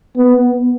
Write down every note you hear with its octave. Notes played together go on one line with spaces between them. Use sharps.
B3